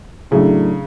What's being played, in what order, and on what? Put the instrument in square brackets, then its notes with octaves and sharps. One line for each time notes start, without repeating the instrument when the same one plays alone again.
[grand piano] A2 F#3 A3 D4 [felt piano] C#3